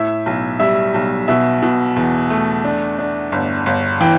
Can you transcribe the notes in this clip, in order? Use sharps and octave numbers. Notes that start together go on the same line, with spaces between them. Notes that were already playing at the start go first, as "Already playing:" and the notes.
Already playing: A2 E5
B1
G3 E5
B1
B2 E5
B2
E2
A3
D4
D4
G1
G1
E3 G5